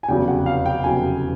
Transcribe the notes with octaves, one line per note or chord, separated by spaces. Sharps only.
G#5
F1 E2 C#3 F#3 G5
F#5
F5
G5
F1 E2 C#3 F#3 G#5